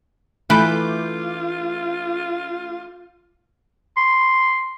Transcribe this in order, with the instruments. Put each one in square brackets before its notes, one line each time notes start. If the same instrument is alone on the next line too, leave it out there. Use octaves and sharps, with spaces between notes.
[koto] E3 B4 [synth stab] A3 D6 G6 [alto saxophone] F4
[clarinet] C6